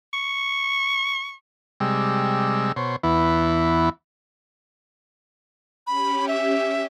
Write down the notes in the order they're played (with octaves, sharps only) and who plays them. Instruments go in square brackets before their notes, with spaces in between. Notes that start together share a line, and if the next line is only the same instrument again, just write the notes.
[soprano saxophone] C#6
[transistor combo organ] C3 G3 G#3 E6
B2 C5 C#5
E2 E3 B3 E4
[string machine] C#4 G4 [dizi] B5
[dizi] E5